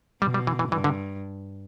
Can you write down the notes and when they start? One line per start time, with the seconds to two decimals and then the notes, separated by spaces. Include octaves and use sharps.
0.22 B2 G3
0.34 G3
0.47 E3
0.59 E3
0.71 G2 E3
0.84 D3